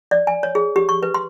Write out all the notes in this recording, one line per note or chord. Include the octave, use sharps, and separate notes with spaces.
D5
G#5
C#5
G#4
G4
C#6
B4
C6